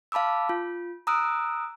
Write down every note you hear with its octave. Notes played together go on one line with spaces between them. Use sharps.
F5 A5 B5 D6 E6
F4
A#5 D#6 E6 F#6 D7